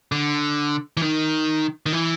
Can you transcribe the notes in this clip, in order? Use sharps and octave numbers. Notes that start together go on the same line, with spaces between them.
D3
E3
D#3
D#3
E3